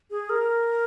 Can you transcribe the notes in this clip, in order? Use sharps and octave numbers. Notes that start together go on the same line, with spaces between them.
G#4
A#4